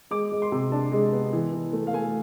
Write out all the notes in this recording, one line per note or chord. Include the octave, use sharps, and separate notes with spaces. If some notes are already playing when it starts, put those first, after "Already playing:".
G#3 D6
G#3
C6
C3
D4 A5
G#3
B3
E3
E3
A3
F5
A3 G#5